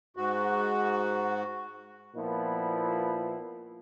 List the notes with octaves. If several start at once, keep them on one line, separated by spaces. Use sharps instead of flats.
G#2 F#4
A#2 F3 B3 E4